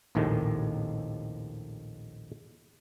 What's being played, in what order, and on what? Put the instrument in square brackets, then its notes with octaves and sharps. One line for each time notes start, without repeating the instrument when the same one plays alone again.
[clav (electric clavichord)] A#1 D#2 A2 C3 D#3 G#3